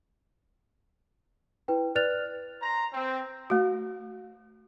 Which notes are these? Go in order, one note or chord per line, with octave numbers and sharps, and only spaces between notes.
E4 B4 G5
B4 D5 F6 F#6 A6 F7
C5 A#5
C4
A3 F#4